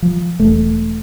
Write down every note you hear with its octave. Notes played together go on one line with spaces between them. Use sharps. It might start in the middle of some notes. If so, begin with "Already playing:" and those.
F3
E1 A3